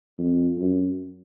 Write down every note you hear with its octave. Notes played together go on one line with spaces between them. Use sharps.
F2
F#2